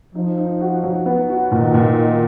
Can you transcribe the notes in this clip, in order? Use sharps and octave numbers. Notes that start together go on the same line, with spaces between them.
F3 D#4
D#4
F#4
F#3
B3
F#4
A#2 D#3
A#2